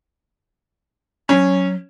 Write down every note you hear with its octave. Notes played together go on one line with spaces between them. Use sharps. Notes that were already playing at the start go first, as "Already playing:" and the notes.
F#3 C#4